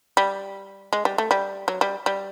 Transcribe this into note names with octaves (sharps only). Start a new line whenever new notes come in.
G3
G#3
G3
A3
G3
F#3
G3
G3